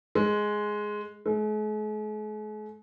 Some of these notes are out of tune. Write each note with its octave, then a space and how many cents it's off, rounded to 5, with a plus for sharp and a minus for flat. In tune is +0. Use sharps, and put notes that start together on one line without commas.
G#3 +5
G#3 +45